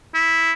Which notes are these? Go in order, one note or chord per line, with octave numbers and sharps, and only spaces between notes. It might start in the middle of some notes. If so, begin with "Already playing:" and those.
E4